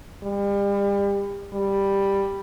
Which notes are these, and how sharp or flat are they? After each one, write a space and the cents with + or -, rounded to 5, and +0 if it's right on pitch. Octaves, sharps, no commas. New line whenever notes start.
G3 +35
G3 +5